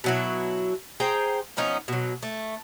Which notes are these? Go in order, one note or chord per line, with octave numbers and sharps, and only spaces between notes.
B2 F#3 E4
G#4 C5 G5 A#5
F3 B3 C#4 D#4
B2 F#3
A3